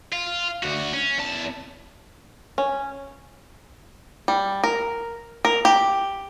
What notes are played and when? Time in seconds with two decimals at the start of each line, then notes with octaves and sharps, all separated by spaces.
0.12 F4
0.63 D2 F#4
0.93 C#4
1.18 E2 A5
2.58 C#4
4.28 G3
4.64 A#4
5.45 A#4
5.65 G4